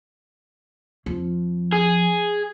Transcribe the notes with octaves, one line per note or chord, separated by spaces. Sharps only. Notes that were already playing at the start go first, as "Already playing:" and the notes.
F2 F3
G#4